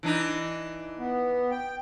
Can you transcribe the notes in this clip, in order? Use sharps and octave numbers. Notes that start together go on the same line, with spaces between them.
E3 D4 D#4
B3
G5